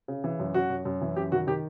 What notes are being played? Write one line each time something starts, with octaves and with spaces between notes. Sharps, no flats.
C#3
E3
F#2
F#2 F#4
F#2
F#2
E3
F#2 G4
D#3 F#4
D#3 G4